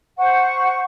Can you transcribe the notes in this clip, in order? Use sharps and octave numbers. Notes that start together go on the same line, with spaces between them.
C5 F#5 C#6